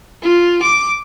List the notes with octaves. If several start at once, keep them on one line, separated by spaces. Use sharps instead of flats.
F4
D6